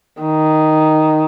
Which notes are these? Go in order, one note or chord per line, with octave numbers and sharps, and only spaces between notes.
D#3